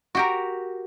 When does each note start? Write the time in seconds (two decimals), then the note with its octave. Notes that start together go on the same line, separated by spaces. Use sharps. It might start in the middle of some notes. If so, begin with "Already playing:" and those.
0.15 F#4 G4 A#4